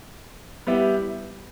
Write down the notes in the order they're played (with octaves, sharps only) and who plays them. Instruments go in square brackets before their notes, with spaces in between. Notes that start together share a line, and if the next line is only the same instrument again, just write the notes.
[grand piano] G3 B3 E4 G4